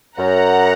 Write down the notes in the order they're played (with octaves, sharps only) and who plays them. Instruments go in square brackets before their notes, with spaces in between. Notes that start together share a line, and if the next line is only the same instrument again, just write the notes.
[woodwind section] F#2 [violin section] F#5 A#5